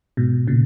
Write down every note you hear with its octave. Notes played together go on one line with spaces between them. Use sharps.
G#2 B2
A#2 C#3